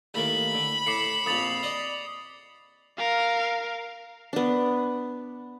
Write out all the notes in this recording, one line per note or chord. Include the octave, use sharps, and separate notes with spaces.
D#2 A2 A#3 B5
D3
A2 D6 C7 C#7
A#1 F2 D#6 A6 F7
D5 D#5
A#4 F5
B3 D4